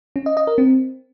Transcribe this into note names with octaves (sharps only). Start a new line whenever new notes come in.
C#4
D#5
D#5
A#4
C4